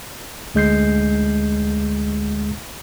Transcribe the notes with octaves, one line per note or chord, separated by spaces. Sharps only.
D2 G#3 G6 C7